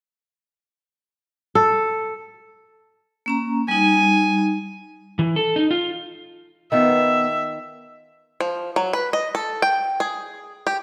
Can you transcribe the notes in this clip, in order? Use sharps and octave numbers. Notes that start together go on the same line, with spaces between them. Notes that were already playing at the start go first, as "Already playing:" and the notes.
A4
A#3 C#4 A#5
G3 D#4 G#5
E3
A4
D#4
F4
D#3 B3 D#4 F4 E5
F3
F#3
B4
D#5
A4
G5
G#4
G4